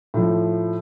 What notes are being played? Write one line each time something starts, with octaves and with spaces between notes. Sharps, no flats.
A2 F3